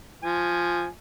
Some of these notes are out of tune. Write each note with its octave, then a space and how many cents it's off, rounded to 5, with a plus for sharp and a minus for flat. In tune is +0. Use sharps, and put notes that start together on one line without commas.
F3 +0 G#5 +0